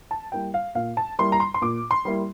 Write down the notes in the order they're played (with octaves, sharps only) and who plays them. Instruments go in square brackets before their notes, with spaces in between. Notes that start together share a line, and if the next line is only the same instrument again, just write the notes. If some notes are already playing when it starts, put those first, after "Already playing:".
[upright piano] A5
G3 A#3 E4 G5
F5
A#2 F5
A5
G3 A#3 E4 C6
A#5
C6
C6
A#2 D6
C6
G3 A#3 E4